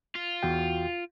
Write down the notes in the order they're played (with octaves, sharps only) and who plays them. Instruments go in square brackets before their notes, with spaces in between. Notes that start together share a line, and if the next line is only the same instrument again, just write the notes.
[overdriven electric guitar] F4
[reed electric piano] E2 F#4 G5